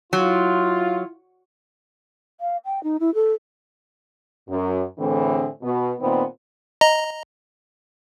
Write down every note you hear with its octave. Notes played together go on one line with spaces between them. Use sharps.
F#3 E4 F4
F5
G5
D#4
E4
A4
F#2
A2 D3 E3 A3 C4 G#4
B2 B3
A#2 D#3 B3 C4
D#5 A#5